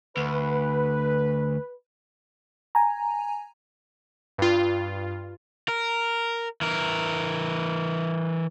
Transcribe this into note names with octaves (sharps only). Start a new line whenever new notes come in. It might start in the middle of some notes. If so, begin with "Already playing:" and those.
D2 B4
G#5 A#5
G2 F4
A#4
E3 A#4